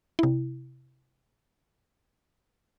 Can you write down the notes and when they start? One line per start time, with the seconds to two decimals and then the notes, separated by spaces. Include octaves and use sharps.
0.19 C3 E4